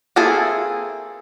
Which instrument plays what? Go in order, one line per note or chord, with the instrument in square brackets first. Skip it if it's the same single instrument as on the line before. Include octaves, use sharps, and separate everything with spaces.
[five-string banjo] A#3 C4 E4 G#4 A4